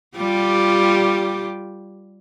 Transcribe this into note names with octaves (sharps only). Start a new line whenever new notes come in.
G3 F4 G4